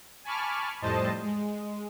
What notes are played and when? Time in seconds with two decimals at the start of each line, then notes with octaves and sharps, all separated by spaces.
0.24 G#5 A5 B5 C#6 D6 F6
0.82 F2 A2 G3 C5 D#5 A5
1.22 G#3